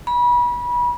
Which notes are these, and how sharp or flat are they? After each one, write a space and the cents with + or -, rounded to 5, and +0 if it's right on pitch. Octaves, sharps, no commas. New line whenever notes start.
B5 -30